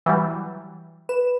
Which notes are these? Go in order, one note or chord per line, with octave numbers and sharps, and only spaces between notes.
E3 F#3 G3
B4 E7